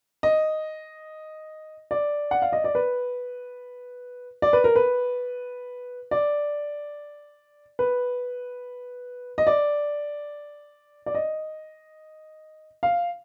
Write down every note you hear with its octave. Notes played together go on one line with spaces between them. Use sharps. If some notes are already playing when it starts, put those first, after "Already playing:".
D#5
D5
F#5
F5
D#5
D5
B4
D5
B4
A#4
B4
D5
B4
D#5
D5
D5
D#5
F5